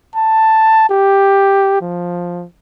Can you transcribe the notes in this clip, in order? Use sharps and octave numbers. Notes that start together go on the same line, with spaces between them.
A5
G4
F3